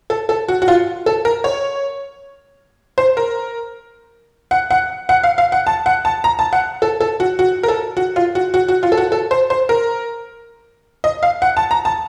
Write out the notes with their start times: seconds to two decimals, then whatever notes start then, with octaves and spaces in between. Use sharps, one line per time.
0.10 A4
0.29 A4
0.48 F#4
0.62 F#4
0.68 F4
1.06 A4
1.25 A#4
1.44 C#5
2.98 C5
3.17 A#4
4.51 F#5
4.71 F#5
5.09 F#5
5.24 F5
5.38 F5
5.52 F#5
5.67 A5
5.86 F#5
6.05 A5
6.24 A#5
6.39 A5
6.53 F#5
6.82 A4
7.00 A4
7.20 F#4
7.39 F#4
7.63 A#4
7.68 A4
7.97 F#4
8.16 F4
8.35 F#4
8.54 F#4
8.68 F#4
8.83 F4
8.92 A4
8.97 F#4
9.12 A4
9.31 C5
9.50 C5
9.69 A#4
11.04 D#5
11.23 F5
11.42 F#5
11.57 A5
11.71 A#5
11.85 A5